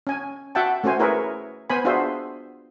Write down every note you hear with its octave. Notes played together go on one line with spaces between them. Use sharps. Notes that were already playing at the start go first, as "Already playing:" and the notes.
C#4 G#5
F#4 E5 F#5 G5 A5
A3 C#4 F#4 C5 G#5
E4 G#4 A#4 B4 C#5 E5
B3 C5 G#5 B5
D4 F4 F#4 G#4 C5 E5